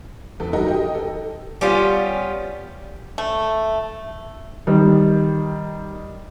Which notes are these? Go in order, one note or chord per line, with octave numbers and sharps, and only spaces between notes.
E2 A4
G3 D#4 F#4 A4 A#4 D#5
G4 D#5 G5
A4
G3 B3 C#4 F4
A3
D#3 G3